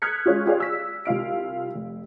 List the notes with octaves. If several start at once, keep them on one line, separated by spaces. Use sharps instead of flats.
D#6 F6 F#6 G#6 B6 C#7
G#3 C#4 F4 F#4
F4 G4 G#4 C#5 D5 F5
E6 B6
C2 F4 F5 D7
F1